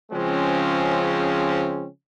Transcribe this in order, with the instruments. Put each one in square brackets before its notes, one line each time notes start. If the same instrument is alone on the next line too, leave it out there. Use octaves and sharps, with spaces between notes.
[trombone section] C#3 F3 G#3 C4 C#4